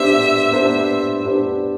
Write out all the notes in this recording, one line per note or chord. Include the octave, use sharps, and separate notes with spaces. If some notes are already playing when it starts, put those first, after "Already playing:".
Already playing: B3 D4 G4 C5 E5
B3 D4 G4 C5
B3 D4 G4 C5